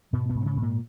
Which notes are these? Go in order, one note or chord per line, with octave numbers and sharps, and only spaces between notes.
G#2 B2 B3
B2 B3
G#2
B3
C#3 C#4
G#2
A#2 A#3